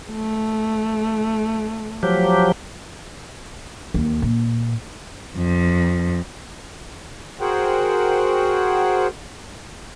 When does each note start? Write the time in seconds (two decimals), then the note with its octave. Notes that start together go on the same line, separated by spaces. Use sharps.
0.11 A3
2.03 F3 F#3 G4
3.94 D#2
4.22 A#2
5.37 F2
7.41 F#4 G#4 A#4 C5 F#5 G5